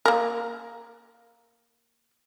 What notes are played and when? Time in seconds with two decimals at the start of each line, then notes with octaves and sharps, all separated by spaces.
0.05 A#3 A#4